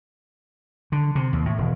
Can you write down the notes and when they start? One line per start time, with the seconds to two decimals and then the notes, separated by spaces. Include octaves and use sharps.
0.92 D3
1.15 C3
1.33 D#2
1.45 A2
1.58 E1